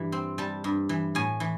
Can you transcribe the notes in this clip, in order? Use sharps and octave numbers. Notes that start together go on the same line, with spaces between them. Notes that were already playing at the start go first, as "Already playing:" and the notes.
Already playing: G2 E3
C4
G3 A5
G2
E3
A2 G#5
E3